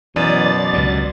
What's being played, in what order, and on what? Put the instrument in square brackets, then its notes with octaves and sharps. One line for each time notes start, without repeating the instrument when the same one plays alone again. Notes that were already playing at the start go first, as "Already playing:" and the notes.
[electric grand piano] F#2 [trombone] B2 [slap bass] E3 [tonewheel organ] D5 A6
[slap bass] C#2 G2